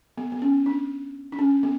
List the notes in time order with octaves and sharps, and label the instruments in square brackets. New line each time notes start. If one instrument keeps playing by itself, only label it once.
[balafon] B3
B3
C#4
D4
D4
C#4
B3